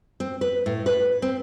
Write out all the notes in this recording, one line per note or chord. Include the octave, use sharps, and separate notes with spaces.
C4
B4
A2
B4
C4